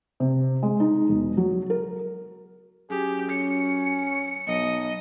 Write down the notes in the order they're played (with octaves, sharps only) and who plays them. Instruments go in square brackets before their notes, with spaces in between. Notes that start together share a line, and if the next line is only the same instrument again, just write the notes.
[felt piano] C3
G#3
D#4
E1
F#3
A#4
[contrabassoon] F#2 [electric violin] G4 [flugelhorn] G#4
[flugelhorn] C#4 [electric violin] C#7
[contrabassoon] B1 [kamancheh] D#5